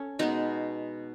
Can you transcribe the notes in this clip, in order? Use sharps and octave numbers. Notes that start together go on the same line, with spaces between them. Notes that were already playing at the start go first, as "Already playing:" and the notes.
Already playing: C#4 A4
B2 G#3 B3 D#4